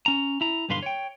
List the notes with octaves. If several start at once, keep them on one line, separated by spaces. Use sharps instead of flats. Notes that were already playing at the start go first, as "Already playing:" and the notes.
C#4 A#5
E4 A#5
B1 G2 D3 B4 F5 C6
C#5 G5